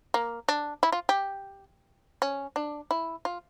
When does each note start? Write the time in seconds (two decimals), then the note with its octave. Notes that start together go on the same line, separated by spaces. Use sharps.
0.14 A#3
0.49 D4
0.83 E4
0.92 F4
1.09 G4
2.22 C#4
2.56 D4
2.91 E4
3.25 F4